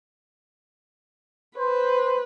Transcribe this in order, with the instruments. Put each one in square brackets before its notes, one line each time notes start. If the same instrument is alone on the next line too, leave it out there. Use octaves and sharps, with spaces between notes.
[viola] B4 [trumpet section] C5